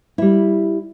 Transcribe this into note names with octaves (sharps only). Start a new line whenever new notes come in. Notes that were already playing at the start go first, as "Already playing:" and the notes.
G3 E4